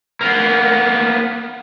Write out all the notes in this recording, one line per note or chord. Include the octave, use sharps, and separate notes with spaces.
A#3 B3